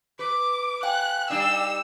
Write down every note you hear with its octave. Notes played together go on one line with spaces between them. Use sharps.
B4 D6
F5 G5 G#5 F#6
G3 D4 D#4 E6